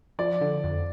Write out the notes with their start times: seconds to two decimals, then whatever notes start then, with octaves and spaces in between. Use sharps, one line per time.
0.19 F3 D5
0.41 D3
0.64 F2